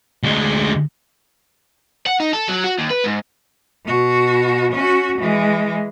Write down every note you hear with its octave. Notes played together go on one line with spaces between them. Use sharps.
D2 G#3
F#5
D#4
A4
F#3
F#4
D#2
B4
G#2
B2 F#4
C#4 F#4
E3 G#3